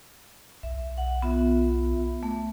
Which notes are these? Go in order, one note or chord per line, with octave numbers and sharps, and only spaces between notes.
B1 E5
F#5
B3 F4 E5
A3